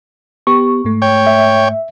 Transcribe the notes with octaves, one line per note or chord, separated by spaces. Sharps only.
B3 G4 C#6
G#2 A3
C#5 G5
E5